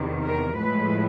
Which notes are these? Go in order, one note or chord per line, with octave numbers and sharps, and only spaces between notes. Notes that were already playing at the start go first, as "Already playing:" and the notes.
Already playing: E2 C3 D#3
A#4
A2 F3 G#3 B4